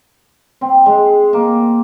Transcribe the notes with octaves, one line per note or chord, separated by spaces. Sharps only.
C4
G#3
A#3